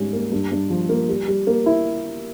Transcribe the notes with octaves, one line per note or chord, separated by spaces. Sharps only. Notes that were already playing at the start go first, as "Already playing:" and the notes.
Already playing: G#2 G3 C#4
A#3
G2
G2
F3
A#3
G3
G3
A#3
E4